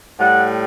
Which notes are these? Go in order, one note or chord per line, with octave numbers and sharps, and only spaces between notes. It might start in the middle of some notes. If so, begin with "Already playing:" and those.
A2 G3 F#5